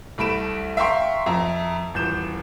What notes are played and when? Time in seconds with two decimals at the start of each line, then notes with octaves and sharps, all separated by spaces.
0.18 C2 A3 B5 D7 E7
0.77 E5 F5 G5 A#5 C6 C#6
1.26 F2 E5 A#5
1.94 D#1 E2 G6 E7